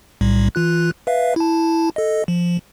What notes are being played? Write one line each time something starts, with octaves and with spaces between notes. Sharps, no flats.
B1 A2 G3
E3 F4 F#6
B4 E5 F5
E4 A5
A4 D#5
F3